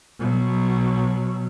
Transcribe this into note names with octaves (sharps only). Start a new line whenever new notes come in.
B2 F#3